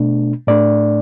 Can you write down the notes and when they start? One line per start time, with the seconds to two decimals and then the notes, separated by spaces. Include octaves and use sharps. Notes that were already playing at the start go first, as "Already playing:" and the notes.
Already playing: B2 A3 D4
0.47 A2 A3 D4 D5